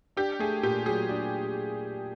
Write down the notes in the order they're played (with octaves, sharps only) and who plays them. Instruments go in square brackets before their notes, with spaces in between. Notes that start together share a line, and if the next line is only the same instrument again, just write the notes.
[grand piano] D4 [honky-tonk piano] G4
[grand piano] A3 [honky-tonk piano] G#4
[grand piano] A#2 [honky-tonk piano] G4
[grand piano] F#3 [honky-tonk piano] G#4
[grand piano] D4